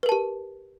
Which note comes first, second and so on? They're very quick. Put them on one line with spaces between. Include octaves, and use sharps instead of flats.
B4 A#4 A5 G4